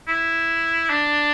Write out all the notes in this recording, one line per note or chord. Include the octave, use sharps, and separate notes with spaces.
E4
D4